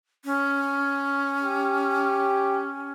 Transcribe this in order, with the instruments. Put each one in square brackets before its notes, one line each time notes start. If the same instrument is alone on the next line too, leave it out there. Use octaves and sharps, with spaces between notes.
[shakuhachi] C#4
[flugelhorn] G4